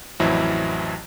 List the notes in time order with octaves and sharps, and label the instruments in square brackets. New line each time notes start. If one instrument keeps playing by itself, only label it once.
[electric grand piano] A1 F2 E3 F#3 E4 C5